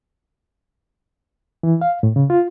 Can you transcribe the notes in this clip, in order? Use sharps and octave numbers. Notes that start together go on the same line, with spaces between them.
E3
F5
A2
C#3
F4